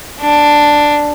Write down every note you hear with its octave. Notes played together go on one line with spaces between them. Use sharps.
D4